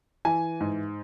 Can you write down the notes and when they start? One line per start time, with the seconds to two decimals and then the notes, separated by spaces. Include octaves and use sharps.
0.25 E3 G#5
0.61 G#2